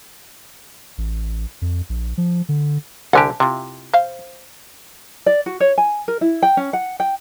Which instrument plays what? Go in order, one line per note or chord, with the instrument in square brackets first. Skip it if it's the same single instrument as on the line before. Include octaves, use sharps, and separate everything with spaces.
[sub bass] A1
F2
A#1
F3
D3
[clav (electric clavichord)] C2 D3 G4 [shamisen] F#5 G#5 A5
[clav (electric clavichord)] C3 [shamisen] E4 F4
[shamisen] C5 F5
[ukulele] D5
F#4
C#5
G#5
A#4
E4
G5
C#4
F#5
G5